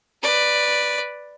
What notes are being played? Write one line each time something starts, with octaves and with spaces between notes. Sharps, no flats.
B4 D5